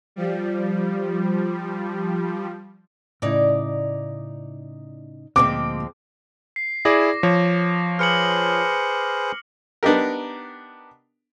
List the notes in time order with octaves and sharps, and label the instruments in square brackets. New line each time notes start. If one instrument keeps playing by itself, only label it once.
[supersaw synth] F3 G3
[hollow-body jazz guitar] A2 C#3 E4 [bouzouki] D#4 D5
[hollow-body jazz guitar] D2 A#2 [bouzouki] F3 G#3 C4 [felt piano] D6
[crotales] C7
[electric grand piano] E4 G#4 D5 [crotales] D6 A#6
[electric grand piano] F3 C#5
[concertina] G#4 B4 C5 [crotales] F6 C#7 F#7
[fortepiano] B3 D4 D#4 G4 A#4